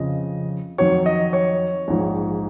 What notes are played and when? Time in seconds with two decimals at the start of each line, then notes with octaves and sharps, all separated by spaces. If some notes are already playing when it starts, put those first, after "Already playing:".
Already playing: F2 C#3 F3 D#5
0.78 F2 D#3 F#3 C#5
1.06 D#5
1.33 C#5
1.88 A#1 G#2 F3